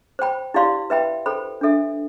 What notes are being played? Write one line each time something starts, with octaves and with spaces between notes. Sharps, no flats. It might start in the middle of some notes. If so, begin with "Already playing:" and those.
C5 G5 B5
E4 G4 D5 F5 C6
B4 E5 G5 B5
A4 C5 G5 B5
D4 A4 E5